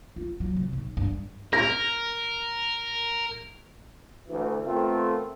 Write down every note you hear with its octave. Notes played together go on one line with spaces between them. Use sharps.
F4
F#3
C3
B1
G2
A#4 A#6
D2 E3
A3 B3 C4 F4 A4 A#4